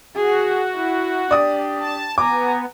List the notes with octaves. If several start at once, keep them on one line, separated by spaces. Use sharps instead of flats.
F#4 G#4
E4
D4 G4 D5 D#6
A5
B3 G#5 A#5 D6